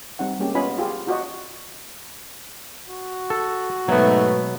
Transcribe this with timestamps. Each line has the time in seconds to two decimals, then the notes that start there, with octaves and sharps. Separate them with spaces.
0.19 G3 C4 D#4 F#5
0.39 G3 G#3 A#3 C#4 G4
0.55 B3 C#4 F4 D#5 G#5 B5
0.78 F4 G4 G#4
1.07 F4 F#4 D5 D#5
2.88 F#4
3.30 A4
3.88 G#2 B2 F#3 A3 B3